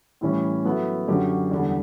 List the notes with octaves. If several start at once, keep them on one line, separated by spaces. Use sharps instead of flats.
A2 E3 G3 C#4
F#3 B3 E4 A4
F#2 D3 F#3 C#4 G4
E2 D3 G3